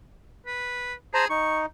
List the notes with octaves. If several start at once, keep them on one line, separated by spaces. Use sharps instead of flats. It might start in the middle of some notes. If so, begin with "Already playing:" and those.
B4
G#4 C5 A5 A#5
D#4 C#6